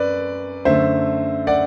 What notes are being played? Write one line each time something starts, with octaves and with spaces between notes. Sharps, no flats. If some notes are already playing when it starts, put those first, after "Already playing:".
Already playing: F#2 B4 D5
F#2 D3 A3 C5 E5
D5 F#5